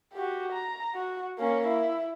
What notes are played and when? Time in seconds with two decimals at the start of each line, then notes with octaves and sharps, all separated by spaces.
0.13 F#4 G4
0.52 A#5
0.94 F#4
1.38 A#3 C#4
1.67 E4